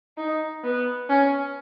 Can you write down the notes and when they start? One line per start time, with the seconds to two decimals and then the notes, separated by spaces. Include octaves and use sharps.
0.18 D#4
0.64 B3
1.09 C#4